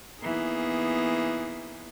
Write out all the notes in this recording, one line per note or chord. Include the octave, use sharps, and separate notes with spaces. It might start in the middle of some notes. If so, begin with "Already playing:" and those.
E3 A#3 B3 D#4 G#4